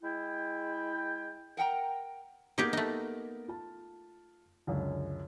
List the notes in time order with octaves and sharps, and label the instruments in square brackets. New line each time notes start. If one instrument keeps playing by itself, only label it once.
[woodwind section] G#3 E4 G5
[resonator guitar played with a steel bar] A#4 F#5 G5 A#5
[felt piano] A#3 B3 A#4 [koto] D#4 G4 G#4
[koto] A3 D#4
[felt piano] F4 A5
C#2 F#2 D3